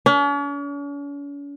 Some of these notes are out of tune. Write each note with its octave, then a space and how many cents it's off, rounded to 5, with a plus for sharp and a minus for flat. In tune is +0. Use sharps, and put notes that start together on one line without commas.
C#4 +45